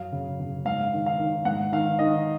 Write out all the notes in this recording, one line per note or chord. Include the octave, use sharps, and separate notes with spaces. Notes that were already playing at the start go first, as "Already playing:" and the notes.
Already playing: F#2 F5
C#3
C#3
G#2 F5
D#3
F5
D#3
G#2 F#5
D#3 F5
D#3 D#5